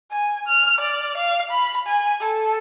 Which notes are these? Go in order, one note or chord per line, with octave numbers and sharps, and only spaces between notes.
G#5
F6
D5
F5
B5
G#5
A4